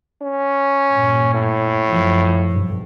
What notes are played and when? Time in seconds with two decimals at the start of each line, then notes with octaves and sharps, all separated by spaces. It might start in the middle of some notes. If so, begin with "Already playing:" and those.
0.22 C#4
0.91 G2 A#2
1.34 A2
1.89 F#2 F3
2.48 B1 G2